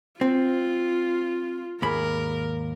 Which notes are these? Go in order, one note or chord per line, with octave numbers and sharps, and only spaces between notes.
C4 F4
D#2 G#2 A#4 B5